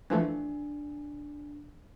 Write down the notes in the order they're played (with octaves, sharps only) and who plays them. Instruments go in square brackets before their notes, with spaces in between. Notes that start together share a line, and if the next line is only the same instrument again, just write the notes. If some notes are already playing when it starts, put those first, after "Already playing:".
[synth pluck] E3 F3 A3 [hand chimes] D4